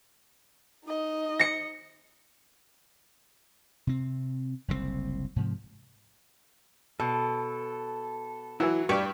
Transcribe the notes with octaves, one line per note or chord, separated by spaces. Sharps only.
D#4 D#5
A#6 C#7
C3 C4
F#1 C2 A2 C4
G#2 C3 F3
B2 A4
E3 F#3 E4
G2 G4 B4 D5 C#6